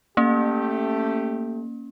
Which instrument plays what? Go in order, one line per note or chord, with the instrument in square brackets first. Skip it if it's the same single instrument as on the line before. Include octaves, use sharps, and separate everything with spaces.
[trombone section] A3 G4 [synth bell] A#3 C#4